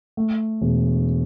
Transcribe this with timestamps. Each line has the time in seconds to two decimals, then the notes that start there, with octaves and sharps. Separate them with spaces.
0.17 A3
0.61 E1